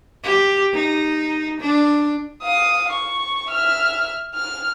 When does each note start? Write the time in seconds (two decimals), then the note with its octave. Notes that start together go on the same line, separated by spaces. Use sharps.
0.23 G4
0.74 D#4
1.60 D4
2.43 F5 D#6
2.93 C#6
3.49 E5 F6
4.35 F6